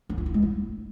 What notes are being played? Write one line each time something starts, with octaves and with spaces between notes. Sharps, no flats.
C#4
F4
E4
G#3
E4